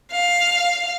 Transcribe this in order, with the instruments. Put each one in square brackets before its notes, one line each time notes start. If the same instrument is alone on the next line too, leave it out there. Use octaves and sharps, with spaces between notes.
[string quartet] F5